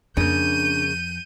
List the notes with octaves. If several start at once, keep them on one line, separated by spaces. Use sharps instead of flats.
F2 C#3 A#3 D4 G6 D#7